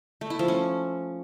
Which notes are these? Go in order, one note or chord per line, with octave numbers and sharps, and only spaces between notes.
A3
E4
F3
C#4